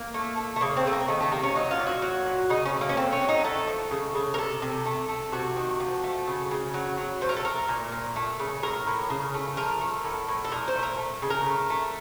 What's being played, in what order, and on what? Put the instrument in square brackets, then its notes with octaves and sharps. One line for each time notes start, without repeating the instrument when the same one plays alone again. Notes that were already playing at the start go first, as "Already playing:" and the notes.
Already playing: [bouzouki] A#3
A3
A3
A3
C#3 A#3
C4
C#3 A3
A#3
D#3 A3
A3
C3 A#3
C#4
F#3 D#4
F4
A#2
F#4
F#3
A#2
C#3 D#4
C#4
A3
A#3
C#4
A3 C4
C#4
F#3
D#4
A3 A4
F3
C#3
C#3
A#4
C3 A4
C3
A3
A3
C3 F#4
D#3
F3
A3
C#3
C#3
F#3
F#3
A3 C5
A#4
A4
A3 A#4
A#2
A#2
A3
C#3
A2 A#4
A2
C#3
A3
F3 A#4
A3
A2
A2
A4
A#2 A#4
C5
A3
A#4
A3
C#3
A#4
A3
A3